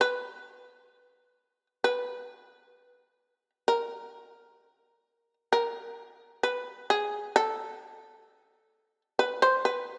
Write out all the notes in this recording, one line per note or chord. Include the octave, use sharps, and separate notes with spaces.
B4
B4
A#4
A#4
B4
G#4
A4
B4
C5
B4